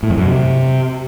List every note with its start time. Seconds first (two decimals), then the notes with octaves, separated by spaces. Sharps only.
0.03 A2
0.10 F2
0.17 F#2
0.25 C3